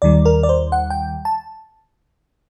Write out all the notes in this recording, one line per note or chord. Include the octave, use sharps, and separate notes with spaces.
D#2 D#3 G3 D5
A#4
D5
C5
F#5
G5
A5